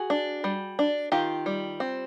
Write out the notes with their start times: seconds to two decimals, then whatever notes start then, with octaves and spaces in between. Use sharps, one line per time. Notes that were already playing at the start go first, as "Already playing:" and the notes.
Already playing: F#4 G#4
0.10 D4
0.44 G3
0.79 D4
1.12 D#3 F4 G4
1.46 G3
1.80 C4